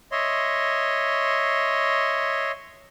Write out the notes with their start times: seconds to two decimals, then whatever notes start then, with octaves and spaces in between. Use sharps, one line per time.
0.12 C#5 D#5 E5 C6